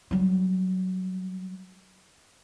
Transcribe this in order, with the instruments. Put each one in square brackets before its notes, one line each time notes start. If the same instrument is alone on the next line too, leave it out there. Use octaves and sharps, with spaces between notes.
[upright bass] F#3 G3